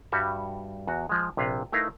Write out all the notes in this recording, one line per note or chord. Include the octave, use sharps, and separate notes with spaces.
G2 G3 F#4 E5
E2 F#4
F3 G#3
A#1 C3 B4 F5
A3 D#4 E4 A#4 B4 F5